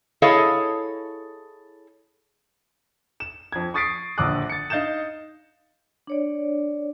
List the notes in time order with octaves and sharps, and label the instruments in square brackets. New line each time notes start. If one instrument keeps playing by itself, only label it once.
[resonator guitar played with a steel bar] E4 G#4 A4 C#5 D#5 F5
[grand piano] E7
F2 G#6
C#6 D#6 A6 B6 C7 D7
D#1 A#1 D3 D6 D#6 F#6
A6 C#7
D#4 D#5 F5 G6 A6 E7
[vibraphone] D4 C#5 D5